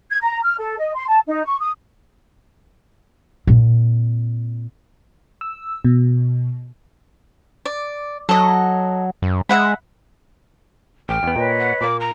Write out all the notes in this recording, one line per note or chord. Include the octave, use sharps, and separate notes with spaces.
G#6
A#5
F6
A4
D#5
C6
A5
D#4
C#6
D#6
A#2 C4
E6
B2
D5
F#3 A4 D#5
F#2
G#3 E5 F#5 B5
A1 G5 F6
E2 B3
A#2 B4 C#5 D#5
F#5
A#2 A#3 D6
A#5